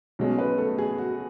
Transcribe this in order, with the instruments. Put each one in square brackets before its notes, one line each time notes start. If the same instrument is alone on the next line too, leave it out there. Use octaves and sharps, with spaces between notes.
[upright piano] B1 B2 G#3 C#4
B3 B4
A3 A4
G#4
F#4